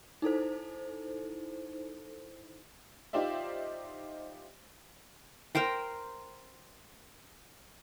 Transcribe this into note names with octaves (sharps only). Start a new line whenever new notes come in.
D#4 E4 A4 C5
D#4 F4 G4 C5 D5 E5
A#4 C5 G5 C6